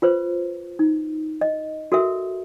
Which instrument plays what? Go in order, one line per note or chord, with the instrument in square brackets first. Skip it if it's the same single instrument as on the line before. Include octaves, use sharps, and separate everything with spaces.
[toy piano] F4 B4 C5
D#4
D#5
F#4 A4 A#4 E5